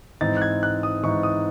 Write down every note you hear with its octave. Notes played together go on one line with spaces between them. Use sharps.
G#2 E3 C4 D#4 A6
F#6
G#6
F#6
D#6
G#2 E3 C4 D#4 C#6
D#6